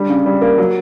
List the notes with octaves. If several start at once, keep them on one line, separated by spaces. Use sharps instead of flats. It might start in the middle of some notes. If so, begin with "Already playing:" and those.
Already playing: D3 G3
C#3
G3
A#3
F#3